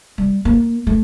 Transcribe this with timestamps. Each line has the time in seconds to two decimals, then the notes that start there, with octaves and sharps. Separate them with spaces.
0.18 G3
0.45 A#3
0.87 A3